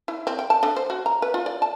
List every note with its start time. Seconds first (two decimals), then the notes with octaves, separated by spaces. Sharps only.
0.08 E4
0.27 C4
0.39 G5
0.50 A5
0.63 D3
0.76 C5
0.90 F#4
1.06 A#5
1.22 B4
1.34 F4
1.46 D5
1.62 A5